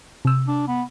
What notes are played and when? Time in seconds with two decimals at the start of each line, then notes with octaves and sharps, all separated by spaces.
0.25 C3 E6
0.48 D4
0.68 B3